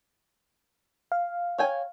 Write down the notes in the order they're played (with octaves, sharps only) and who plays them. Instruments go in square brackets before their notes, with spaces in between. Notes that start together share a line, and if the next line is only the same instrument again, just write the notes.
[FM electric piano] F5
[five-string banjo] C#5 G5 G#5